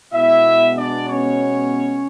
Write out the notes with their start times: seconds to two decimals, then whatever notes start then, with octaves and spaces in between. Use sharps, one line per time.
0.13 B2 G#3 B3 E4 E5
0.77 D4 D5
1.09 C#4 C#5